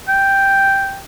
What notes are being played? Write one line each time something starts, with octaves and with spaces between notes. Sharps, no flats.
G5